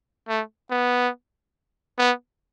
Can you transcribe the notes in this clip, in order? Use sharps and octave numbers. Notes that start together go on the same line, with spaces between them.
A3
B3
B3